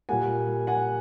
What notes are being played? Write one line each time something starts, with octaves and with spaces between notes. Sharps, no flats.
A#2 G3 A#3 F#5 G#5
F#5 G#5